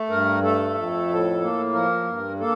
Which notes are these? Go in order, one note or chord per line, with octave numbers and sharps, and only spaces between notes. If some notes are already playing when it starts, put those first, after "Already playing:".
Already playing: A3
G2 A#4
A3 A4
F2
A2
A#3
F3 A#4
G2
A#3 A4